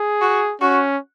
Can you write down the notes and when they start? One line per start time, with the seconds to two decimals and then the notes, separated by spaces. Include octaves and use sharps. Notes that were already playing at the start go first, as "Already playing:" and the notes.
Already playing: G#4
0.21 F#4
0.61 C#4 F#4